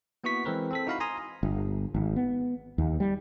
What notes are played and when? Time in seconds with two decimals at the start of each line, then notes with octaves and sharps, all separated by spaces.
0.24 A#3 B3 E4 F#4 C#6 B6
0.45 E3 G#3 C4 A#4 B4
0.71 C4 A4 B6
0.87 D#4 E4 F#4 F5 A#5 B5
1.00 G#5 A#5 C6 D#6
1.43 G1
1.94 G#1
2.16 B3
2.78 D#2
3.00 G3